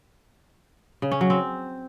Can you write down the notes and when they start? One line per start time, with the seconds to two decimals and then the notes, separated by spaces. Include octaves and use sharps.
1.02 C#3
1.11 C#4
1.21 F#3
1.30 C4